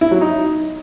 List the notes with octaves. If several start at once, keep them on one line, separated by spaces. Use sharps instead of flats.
E4
F#3
D#4